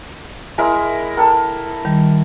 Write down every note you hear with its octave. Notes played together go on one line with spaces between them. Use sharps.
G#3 E4 A#4
A4 A#4 G5
D#3 G3